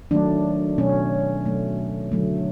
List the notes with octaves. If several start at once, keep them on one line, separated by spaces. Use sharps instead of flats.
D#3 F#3 A3 D4
B2 F#3 A3 C#4
B2 F#3 A3
D3 F#3 A3